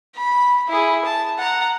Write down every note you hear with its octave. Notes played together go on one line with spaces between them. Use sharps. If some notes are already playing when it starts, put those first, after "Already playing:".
B5
E4 G#4
A5
F#5 A#5